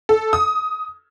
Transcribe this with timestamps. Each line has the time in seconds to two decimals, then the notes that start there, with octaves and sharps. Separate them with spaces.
0.09 A4
0.33 D#6